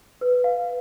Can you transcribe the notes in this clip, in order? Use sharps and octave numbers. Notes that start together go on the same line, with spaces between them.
B4
F5